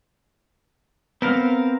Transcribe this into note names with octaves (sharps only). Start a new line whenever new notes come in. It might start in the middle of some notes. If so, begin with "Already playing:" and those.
B3 C4 A#4 F5